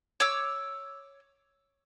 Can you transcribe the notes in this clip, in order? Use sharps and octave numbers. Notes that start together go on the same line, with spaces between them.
C#5 D6 E6